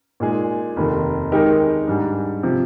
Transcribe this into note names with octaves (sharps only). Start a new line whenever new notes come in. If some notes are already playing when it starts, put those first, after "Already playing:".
A#2 G#3 D#4 G#4
F1 D#2 D#3
D#3 G#3 D#4 G4 A#4
G#2 G3 D4 G#4
C3 F3